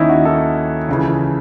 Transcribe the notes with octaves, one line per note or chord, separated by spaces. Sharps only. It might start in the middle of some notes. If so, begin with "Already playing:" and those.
Already playing: D#2 D#3 C#4 D#4 E4
F#4
D#2 D#3 A4
C#2 C#3 E3